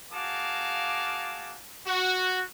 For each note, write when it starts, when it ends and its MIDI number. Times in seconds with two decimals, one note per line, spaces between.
0.12 1.57 58
0.12 1.57 66
0.12 1.57 68
0.12 1.57 77
0.12 1.57 81
0.12 1.57 86
1.87 2.43 66